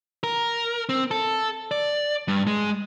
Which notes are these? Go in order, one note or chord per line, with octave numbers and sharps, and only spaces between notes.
A#4
C4
A4
D5
G2
G#3